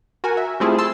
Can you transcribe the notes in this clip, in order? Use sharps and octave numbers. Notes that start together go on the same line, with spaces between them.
F#4 A#4 G#5
E5
G3 A3 C4 E4 F4 G#4
A5 C6 E6